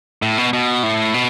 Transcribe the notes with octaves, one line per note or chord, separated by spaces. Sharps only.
A2
B2
B2
A2
B2